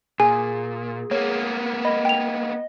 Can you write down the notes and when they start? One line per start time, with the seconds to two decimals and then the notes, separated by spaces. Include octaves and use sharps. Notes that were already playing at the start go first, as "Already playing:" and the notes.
0.20 A#2 G#4 G#5
1.11 A#3 B3 C#5
1.85 D#5 B5
2.05 G5 F7